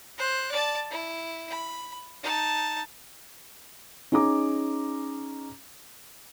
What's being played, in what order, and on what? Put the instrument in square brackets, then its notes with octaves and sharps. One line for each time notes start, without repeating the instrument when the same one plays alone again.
[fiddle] C5 F#6
D5 A5
E4
B5
D#4 A5
[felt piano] C#4 D#4 G#4 A#5 D6